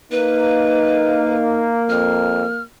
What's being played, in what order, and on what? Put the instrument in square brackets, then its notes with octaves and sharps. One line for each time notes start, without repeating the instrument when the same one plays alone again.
[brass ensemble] A#3 [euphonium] D#4 [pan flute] B4
[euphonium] F2 [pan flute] F6